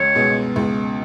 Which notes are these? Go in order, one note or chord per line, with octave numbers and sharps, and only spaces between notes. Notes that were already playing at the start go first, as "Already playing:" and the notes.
Already playing: C#2 C#5
B2 G#3 B3
C#2